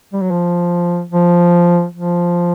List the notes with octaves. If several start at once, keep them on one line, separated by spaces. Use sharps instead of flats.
G3
F#3
F3
F3
F3